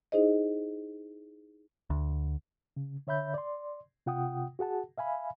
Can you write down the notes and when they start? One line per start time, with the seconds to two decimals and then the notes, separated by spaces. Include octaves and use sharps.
0.12 D#4 E4 G#4 C5 D#5
1.90 D2
2.77 C#3
3.07 D3 C#5 E5 B5 G6
3.34 D5 C6
4.06 C3 F4 F#5 G5 D#6
4.59 F#4 G#4 F#5 A5
4.98 E5 F5 G#5 B5